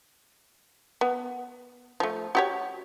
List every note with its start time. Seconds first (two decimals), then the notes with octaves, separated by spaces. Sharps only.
1.01 B3
2.00 F3 A3
2.35 F#4 G4 C#5